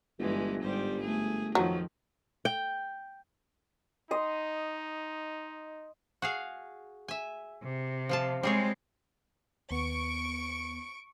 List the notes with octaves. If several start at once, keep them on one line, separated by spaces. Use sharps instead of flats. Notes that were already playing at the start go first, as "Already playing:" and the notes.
G1 G2 E3 G#3
G#2 G3 C5
A3 G#4
F2 D#3 F3 F#3
G5
D#4 D#5 C6
F#4 G#4 F5
E5 G#5
C3
F3 F4 A5
G3 G#3 C4 G#4 C#5
D#2 B3 C#6 D7